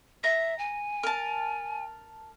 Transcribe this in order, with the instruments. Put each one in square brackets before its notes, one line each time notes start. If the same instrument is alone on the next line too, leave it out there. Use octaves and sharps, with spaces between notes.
[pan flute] E5 [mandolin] A#5
[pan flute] G#5
[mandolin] A#4 A5